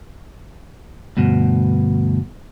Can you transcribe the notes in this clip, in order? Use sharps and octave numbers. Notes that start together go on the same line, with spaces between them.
D2 G2 B2